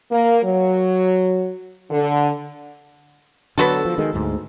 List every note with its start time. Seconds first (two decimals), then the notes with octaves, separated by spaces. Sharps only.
0.11 A#3
0.44 F#3
1.91 D3
3.58 D3 F#3 B3 F#4 A4
3.85 F3
3.98 D#3 G#3
4.14 D2 G#2